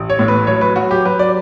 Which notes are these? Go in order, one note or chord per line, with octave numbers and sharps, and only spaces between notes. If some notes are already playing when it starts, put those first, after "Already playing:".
Already playing: A1
C#5
A2
B4
F#3 C#5
B4
F#3 F#4
G4
F#3 B4
D5